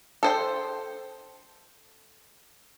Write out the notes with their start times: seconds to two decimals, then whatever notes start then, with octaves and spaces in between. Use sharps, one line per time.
0.23 A4 C5 G5